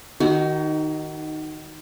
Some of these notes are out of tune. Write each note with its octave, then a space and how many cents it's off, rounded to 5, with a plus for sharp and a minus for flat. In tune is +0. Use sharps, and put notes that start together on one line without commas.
D#3 -10 D#4 +0 F#4 +30